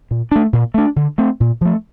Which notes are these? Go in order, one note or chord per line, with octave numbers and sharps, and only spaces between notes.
A#2
A3 D4
A#2
A3 D4
D3
A3 C4
A#2
F3 A3